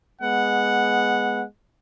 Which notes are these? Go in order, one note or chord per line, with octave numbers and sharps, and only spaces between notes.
G#3 B3 F#5